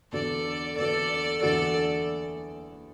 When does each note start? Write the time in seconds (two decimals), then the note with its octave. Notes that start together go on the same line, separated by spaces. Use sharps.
0.12 E2 D3 B3 F#4 A4 D5
0.78 E2 D3 B3 F#4 A4 D5
1.43 E2 D3 B3 F#4 A4 D5